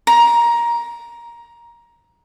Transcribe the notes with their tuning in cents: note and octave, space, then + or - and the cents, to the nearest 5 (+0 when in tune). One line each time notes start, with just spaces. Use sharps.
A#5 +15